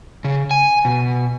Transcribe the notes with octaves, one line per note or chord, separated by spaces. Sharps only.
C#3
G#5
B2